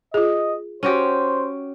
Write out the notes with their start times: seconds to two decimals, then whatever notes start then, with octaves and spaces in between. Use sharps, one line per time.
0.14 F4 G#4 D#5
0.83 C#4 F#4 G4 C5